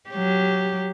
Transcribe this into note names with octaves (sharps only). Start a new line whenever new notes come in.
F#3 G4